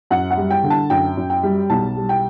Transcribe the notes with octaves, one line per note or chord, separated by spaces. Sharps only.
F#2 F#5
F#5
G3
G5
D3
A5
F#2 G5
F#2
G5
G3
B1 A5
G3
G5